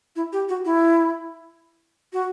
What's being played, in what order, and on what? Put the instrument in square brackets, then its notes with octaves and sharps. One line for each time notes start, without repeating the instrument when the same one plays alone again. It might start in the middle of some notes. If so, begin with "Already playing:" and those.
[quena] E4
G4
F#4
E4
F#4